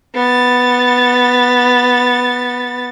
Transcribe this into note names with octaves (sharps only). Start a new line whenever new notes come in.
B3 A6